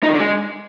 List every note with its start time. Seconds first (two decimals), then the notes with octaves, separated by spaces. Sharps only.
0.03 D#4
0.09 D#3
0.14 D3
0.20 G#3